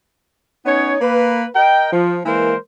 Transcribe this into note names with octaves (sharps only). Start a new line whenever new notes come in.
B3 C#4 D#4 C#5
A#3 B4
A#4 D#5 G5
F3
E3 G#3 A#3 A#4 C5